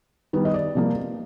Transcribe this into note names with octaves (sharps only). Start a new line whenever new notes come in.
D#3 G3 B3
D#5
D5
C3 F3 A#3